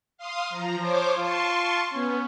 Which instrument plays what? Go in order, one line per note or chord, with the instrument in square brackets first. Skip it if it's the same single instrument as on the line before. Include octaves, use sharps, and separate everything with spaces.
[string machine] F5 C6 D#6
F3 A#5
[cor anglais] F3 [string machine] C5 C#5 D6
[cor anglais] F4 [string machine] A5 C6 C#6
[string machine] B3 [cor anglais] C#4